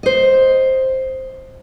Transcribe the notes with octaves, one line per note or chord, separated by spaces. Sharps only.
C5 D#5